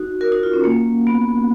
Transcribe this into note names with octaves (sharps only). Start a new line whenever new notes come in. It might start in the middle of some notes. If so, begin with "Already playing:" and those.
Already playing: D#4 F#4
F#4 A#4
D#4 F#4
F4
C#4
A#3
B3